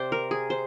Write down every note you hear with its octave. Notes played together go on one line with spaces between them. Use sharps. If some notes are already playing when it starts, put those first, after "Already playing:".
Already playing: C3 C5 D5
A#4
G#4
C5